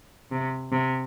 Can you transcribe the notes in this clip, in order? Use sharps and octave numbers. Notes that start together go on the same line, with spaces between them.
C3
C3